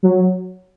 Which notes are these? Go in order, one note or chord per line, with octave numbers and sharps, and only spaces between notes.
F#3